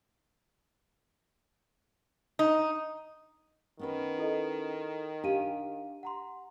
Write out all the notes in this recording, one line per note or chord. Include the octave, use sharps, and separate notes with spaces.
D#4
D#3 B3 C#4 B4
E4 A4 D#5
D4 G4 F5 D#7
F#5 A#5 C6